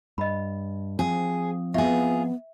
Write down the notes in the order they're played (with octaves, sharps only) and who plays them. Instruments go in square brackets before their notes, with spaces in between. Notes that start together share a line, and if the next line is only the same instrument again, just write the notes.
[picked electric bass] G2 [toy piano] D#5 B5
[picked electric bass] F3 C4 [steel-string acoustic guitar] G#4
[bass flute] B3 [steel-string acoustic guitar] F4 G#4 [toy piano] E5